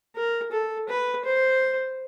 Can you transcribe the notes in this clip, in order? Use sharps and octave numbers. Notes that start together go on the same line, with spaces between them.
A#4
A4
B4
C5